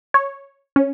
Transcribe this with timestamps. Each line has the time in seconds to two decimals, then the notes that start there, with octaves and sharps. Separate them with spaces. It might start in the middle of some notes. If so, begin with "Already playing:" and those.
0.14 C#5
0.76 C#4